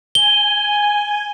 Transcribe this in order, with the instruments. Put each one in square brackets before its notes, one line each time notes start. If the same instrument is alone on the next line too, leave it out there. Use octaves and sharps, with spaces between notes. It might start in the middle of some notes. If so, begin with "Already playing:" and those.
[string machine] G#5 [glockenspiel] G7